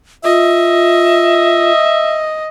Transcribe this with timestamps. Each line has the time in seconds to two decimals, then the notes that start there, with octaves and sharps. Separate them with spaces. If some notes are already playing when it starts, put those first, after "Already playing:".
0.24 F4 D#5 E5